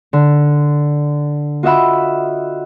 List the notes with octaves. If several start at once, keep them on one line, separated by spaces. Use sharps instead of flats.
D3
F4 F#4 D#5 E5 F#5 B5